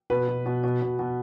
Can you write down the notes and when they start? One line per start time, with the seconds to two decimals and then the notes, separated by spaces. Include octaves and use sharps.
0.10 B2 B4
0.28 B2
0.46 B2
0.64 B2
0.82 B2
0.99 B2